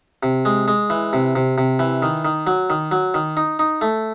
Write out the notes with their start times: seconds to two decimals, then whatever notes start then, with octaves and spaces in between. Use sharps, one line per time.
0.23 C3
0.45 G#3
0.68 G#3
0.90 E3
1.13 C3
1.35 C3
1.58 C3
1.79 E3
2.02 D#3
2.25 D#3
2.47 F#3
2.70 D#3
2.91 F#3
3.14 D#3
3.37 D#4
3.59 D#4
3.81 A3